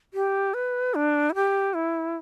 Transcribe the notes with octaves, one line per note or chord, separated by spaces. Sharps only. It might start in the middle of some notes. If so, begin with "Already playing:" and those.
G4
B4
D4
E4
G4
E4